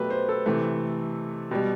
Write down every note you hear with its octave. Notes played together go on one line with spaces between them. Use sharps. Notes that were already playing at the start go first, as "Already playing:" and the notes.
Already playing: B2 F#3 A3 G4 B4
C5
A4
C3 E3 A3
B2 G3 G4